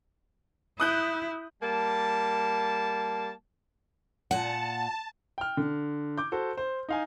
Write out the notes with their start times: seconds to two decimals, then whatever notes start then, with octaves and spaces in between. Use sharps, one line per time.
0.80 E4 D#6 F#6 G6
1.63 G3 A#3 A5
4.31 A#2 F#5 A5
5.38 G5 F6
5.57 D3
6.18 D6 G6
6.32 F#4 A4 C5
6.57 C5
6.89 D#4 F5 G#5